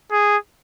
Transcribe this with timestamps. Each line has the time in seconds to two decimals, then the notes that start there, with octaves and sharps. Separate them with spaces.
0.12 G#4